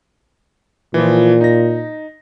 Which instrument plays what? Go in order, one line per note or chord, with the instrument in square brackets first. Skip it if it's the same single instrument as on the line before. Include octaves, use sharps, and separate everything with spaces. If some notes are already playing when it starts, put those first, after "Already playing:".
[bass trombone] A#2 [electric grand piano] E3 F3
[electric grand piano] D#4 A#6